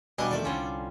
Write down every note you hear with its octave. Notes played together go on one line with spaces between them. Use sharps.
G2 B2 G3 D4 D#5 G#5 D6
E2 C3 D#3 F3 A3 D5
C2 D3 G3 C#4 F4